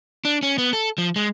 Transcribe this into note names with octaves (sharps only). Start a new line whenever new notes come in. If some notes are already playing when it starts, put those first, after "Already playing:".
D4
C#4
B3
A4
F3
G#3